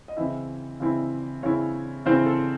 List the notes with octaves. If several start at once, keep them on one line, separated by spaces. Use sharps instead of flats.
D#5
C#3 E3 C4 E4 E5
C#3 E3 C4 E4
C#3 E3 C4 E4 C#5
C#3 E3 C4 E4 C5
A4